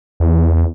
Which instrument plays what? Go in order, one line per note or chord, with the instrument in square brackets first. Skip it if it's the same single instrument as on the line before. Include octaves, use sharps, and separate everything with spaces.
[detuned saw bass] E2